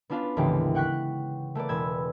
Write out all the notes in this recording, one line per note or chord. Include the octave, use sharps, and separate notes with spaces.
B3 C#4 D4 F4 F5 B5
G#1 D2 C#3 E3 A#3 G4
F#5 G5 C#6 F#6 G6 B6
A3 A#3 B4 D5
E1 B5 E6 G#6